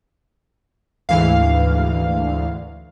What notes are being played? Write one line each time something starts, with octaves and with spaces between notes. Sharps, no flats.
D2 G#2 E3 F5